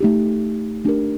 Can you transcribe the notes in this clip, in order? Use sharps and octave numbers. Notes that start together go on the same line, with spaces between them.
A3 D#4 G4
A3 D4 G4 A#4